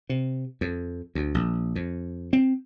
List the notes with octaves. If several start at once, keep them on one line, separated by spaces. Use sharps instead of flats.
C3
F2
D2
A#1
F2
C4